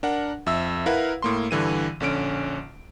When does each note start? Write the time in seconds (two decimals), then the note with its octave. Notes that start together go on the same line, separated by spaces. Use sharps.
0.03 D4 A#4 F#5
0.46 F2 E5 E6
0.86 E4 A#4 B4 F5 F#5
1.22 A2 A#3 C6
1.51 G2 D3 E3 D#7
2.00 A#1 D3 C#4 D7